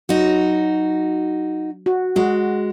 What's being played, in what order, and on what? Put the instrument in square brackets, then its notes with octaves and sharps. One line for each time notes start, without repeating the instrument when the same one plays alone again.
[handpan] F#3 [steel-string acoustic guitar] D#4 F#4
[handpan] F#4
[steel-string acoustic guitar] G#3 [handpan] F#4